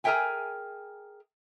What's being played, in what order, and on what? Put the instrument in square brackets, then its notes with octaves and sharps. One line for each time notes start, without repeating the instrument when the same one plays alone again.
[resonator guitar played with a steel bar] G#4 A#4 C#5 E5 G5 G#5